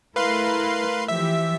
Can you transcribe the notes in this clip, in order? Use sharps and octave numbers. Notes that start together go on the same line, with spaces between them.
A3 E4 A#4 B4 F5 C6
E3 F3 G4 E5